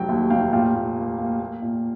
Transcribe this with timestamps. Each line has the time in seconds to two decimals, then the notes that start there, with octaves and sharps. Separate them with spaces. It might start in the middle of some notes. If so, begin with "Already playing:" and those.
Already playing: F1 F#3 G5
0.09 D#2
0.30 F1 F5 G5
0.52 A#2 F5 G5
0.74 A#2
0.96 A#3
1.18 A#3
1.40 A#3
1.62 A#2